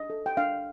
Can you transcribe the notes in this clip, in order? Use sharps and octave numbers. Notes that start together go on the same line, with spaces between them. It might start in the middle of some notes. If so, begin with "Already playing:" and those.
Already playing: D4 D#5
A4
G5
D4 F5